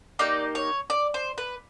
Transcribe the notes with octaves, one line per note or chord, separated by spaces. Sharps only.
A#3 D#4 G4 D5
C#5
D5
C5
B4